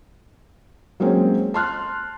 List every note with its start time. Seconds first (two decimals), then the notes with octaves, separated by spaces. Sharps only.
1.00 F#3 G#3 A#3 C4 C#4
1.54 A5 C6 F6 F#6